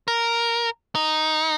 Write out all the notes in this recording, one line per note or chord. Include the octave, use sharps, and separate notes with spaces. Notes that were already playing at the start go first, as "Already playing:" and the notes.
A#4
D#4